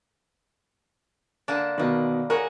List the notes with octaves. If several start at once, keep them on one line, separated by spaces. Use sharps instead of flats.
D3 A#3 D4
B2 D#3 A#3 B4
F#4 G#4 A#4 C#5